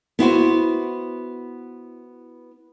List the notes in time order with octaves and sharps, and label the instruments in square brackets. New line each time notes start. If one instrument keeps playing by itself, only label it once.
[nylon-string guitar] B3 E4 F#4 C5